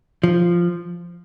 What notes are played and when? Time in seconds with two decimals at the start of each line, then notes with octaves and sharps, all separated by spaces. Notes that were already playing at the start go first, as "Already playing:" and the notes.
0.23 F3